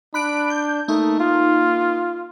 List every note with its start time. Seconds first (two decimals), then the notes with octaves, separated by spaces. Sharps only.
0.14 D4 B5 F#6 D7
0.50 G6
0.88 A3 A#3 D#4
1.20 F4